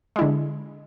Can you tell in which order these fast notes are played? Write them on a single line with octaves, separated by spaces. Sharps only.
G#3 E4 D3